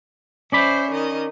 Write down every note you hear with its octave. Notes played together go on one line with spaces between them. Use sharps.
C#4 C5 D5 E5 B5
D#3 D#5